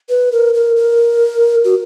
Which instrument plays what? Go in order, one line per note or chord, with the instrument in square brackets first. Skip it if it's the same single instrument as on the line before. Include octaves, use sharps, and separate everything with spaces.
[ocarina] B4
A#4
A#4
A#4
F#4